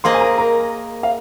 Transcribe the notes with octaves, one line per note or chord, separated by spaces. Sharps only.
A#3 G#4 C5 D#5 C6
G#5
A#4 A#5
A#4 A#5
F5